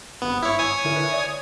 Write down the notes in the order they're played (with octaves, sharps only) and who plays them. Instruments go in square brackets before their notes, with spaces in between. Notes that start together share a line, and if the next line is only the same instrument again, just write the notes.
[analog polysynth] G#1 G2 [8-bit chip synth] B3
[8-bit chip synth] E4 C#5
C#5 G#5 D#6
[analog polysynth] D3 E4 A#4
B4 E5
D5